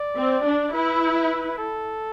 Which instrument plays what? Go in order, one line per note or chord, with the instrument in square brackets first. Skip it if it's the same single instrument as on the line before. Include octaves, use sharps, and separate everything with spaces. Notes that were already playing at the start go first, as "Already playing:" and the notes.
Already playing: [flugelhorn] D5
[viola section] C4
D4
[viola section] E4 [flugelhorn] B4
[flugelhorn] A4